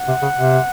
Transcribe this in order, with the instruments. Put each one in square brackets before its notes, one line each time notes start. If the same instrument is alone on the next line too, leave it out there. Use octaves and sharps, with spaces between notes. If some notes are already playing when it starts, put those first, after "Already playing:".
Already playing: [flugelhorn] F#5
[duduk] C3
C#3
C3